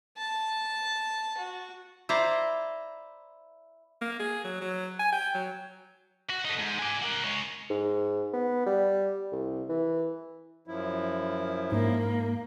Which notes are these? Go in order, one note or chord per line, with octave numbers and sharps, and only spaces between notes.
A5
F#4
E4 C5 D5 A#5
A#3
G#4
F#3
F#3
G#5
G5
F#3
F#4
A3 D#4
G#2
D5 G#5
A#4 F#5
G#3 C#5
G#2
B3
G3
C2
E3
F#2 F3 E4
G#2 A#3